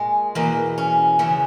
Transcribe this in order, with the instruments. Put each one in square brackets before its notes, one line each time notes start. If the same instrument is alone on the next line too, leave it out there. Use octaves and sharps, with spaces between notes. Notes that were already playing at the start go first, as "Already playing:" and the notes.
Already playing: [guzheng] A#2 G#3
E2 B2 A#3
C#4
E2 C#3 E3 B3